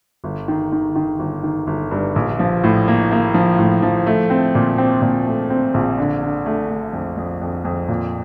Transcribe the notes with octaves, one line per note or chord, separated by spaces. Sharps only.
G1
D#3
D#3
D#3
G1
D#3
G1
G2
A#1
F3
A2
A#3
A#3
F3
A2
F3
A3
C4
A#2
C4
A#2
A3
C4
A#1
D3
D3
A3
A3
F2
F2
F2
F2
A#2